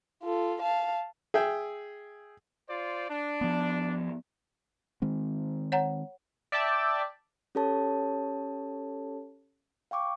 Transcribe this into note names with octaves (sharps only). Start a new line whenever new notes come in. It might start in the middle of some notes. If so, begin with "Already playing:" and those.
F4 A4
F5 A5
G#4 E5 G5
F4 C5 D5
D4
F3 B3
D#3 G#3 C4
C#5 F#5 A#5
D5 E5 G5 A5
C#4 G4 A4 C#5 A5
F5 G5 C#6 D6